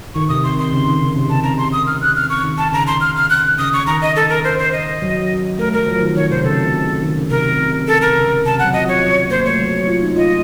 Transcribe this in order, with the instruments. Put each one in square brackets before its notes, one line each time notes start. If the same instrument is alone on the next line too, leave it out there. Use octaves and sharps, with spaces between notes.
[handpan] D#3 [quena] C#6
[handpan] C3 [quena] D#6
[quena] C6
C6
[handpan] C#3
D#3
C#3
C3
[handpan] C#3 [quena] A5
[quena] A#5
C6
D#6
F6
F#6
F6
C#6
[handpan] D#3
[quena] A5
[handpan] C#3 [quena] A#5
[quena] C6
F6
F6
F#6
[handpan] C#3 [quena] D#6
[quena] C#6
[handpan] D#3 [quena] A#5
[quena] D#5
A4
A#4
C5
C5
D#5
[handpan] F#3
[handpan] A3 [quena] A#4
[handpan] F#3 [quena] A#4
[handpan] F3
D#3
[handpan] D#3 [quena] C#5
[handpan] C3 [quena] C5
[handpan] C#3 [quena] A4
[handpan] D#3
C#3
[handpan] C3 [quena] A#4
[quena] A4
A#4
[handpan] C#3
[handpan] C3 [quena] A5
[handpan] C#3
[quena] F#5
[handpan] F#3
[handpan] F3 [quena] D#5
[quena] C#5
[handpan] A#3 [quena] C5
[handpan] A3 [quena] C#5
[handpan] F#3
F4
D#4
[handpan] F4 [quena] D#5